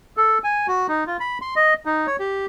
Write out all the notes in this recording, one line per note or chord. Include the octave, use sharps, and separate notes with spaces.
A4
G#5
F#4
D#4
F4
B5
C6
D#5
D#4
C#5
G4